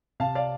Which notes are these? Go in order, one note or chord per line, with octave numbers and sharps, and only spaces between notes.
C3 F5 A5
D5 F5